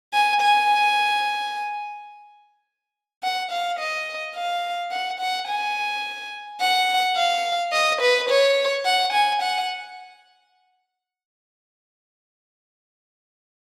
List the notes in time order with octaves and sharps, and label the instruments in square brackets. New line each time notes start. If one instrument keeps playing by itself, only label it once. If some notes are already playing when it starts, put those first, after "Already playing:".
[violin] G#5
G#5
F#5
F5
D#5
F5
F#5
F#5
G#5
F#5
F5
D#5
B4
C#5
F#5
G#5
F#5